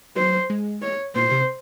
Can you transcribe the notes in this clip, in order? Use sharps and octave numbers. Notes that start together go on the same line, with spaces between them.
F#3 C5
G#3
C#5
A#2 C5
C3